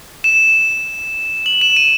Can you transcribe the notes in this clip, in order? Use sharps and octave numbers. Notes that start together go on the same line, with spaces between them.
E7
F#7
E7
D#7